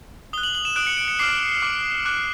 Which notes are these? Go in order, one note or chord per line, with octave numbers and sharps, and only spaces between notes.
D#6 F#6 G7
F#7
F#7
E7
D#6 F#6 D7
C#7
D7
C#7
D6 F6 C7
D6 F6
D6 F#6